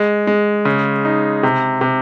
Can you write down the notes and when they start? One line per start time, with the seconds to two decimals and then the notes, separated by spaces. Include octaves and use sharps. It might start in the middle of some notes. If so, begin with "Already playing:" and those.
Already playing: G#3
0.27 G#3
0.65 C#3
1.05 D#4
1.43 C3
1.81 C3